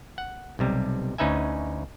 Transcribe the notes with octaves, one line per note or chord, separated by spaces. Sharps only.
F#5
B1 C3 G3
D2 C#4 D#4 B4 E5 G#5